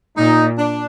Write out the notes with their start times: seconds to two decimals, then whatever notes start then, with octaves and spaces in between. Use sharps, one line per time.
0.17 A#2 D#4
0.58 D4